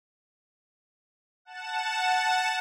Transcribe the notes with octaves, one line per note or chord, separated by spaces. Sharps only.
F#5 A5 E7